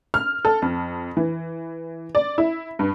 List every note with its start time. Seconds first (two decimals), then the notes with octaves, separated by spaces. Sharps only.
0.14 F6
0.45 A4
0.62 F2
1.17 E3
2.15 D5
2.38 E4
2.79 G2